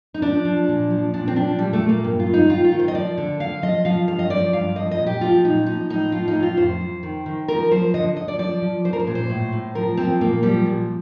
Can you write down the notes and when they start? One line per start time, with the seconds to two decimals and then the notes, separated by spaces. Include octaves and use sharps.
0.14 D#4
0.22 F3 D4
0.45 F3
0.68 A#2
0.90 F3
1.14 A#2 D4
1.28 C4
1.36 F3 D4
1.58 A#2 G3
1.73 A3
1.81 A#2
1.89 A#3
2.04 G2
2.20 F4
2.27 G2
2.34 D#4
2.49 D#3 F4
2.64 F4
2.72 D#3
2.79 C5
2.88 D#5
2.95 F3 D5
3.18 D3
3.40 D3 F5
3.62 F3 D#5
3.85 F3 F5
4.08 G2 F5
4.19 D#5
4.30 F3 D5
4.53 G2 F5
4.76 F3 D#5
4.91 D#5
4.98 A#2
5.07 G4
5.21 F3 F4
5.44 A#2 D#4
5.66 F3 D#4
5.90 A2 D#4
6.12 F3 F4
6.28 D#4
6.35 A2
6.43 F4
6.57 F2 C5
6.81 F2
7.03 D#3
7.26 D#3
7.48 F3 A#4
7.71 F3 C5
7.94 D3 D#5
8.16 D3 D#5
8.28 D5
8.39 F3 D5
8.62 F3
8.84 F3 C5
8.93 A#4
9.00 C5
9.07 A#2
9.15 C5
9.29 A2
9.53 A2
9.75 F3 A#4
9.97 F3 C4
10.21 A#2 A#3
10.43 F3 G3
10.66 A#2